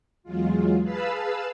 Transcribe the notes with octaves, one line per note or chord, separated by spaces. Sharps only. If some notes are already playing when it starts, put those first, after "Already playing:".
E2 F#3 G#3 F4
G#4 B4 F5 A5 B5 E6